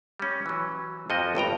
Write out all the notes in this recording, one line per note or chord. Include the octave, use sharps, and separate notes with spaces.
G3 C#4
E3 F#3
F2 F3 F#4 D#5
G1 G2 G5 A#5